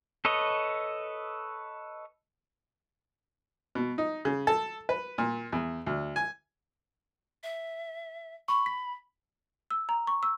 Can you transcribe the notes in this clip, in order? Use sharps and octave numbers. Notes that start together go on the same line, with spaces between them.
A4 B4 C#5 D#5
B2
D#4
C#3
A4
B4
A#2
E2
D2
G#5
E5
B5 C#6
B6
E6
A#5
C#6
E6